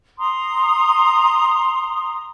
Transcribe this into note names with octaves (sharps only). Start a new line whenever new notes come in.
A#5 C6 D#6